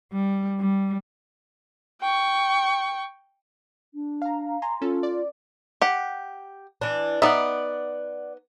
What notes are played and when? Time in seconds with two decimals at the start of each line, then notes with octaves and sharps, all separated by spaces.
0.13 G3
0.59 G3
2.01 G5 C#6
3.94 D4
4.22 F5 A#5
4.62 G#5 A#5 C6
4.82 C#4 F4 A4
5.03 D5
5.81 G4 F#5
6.81 E3 D4
7.22 B3 D#4 D5 E5 F#5